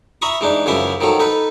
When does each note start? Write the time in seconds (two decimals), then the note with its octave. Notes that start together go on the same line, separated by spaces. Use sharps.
0.22 E5 A#5 B5 C#6 D#6
0.41 E3 G#3 D4 D#4
0.66 F#2 C#3 E3 F3 E5 C6
1.01 D#3 F3 F#3 A4
1.19 D#4 A4 B4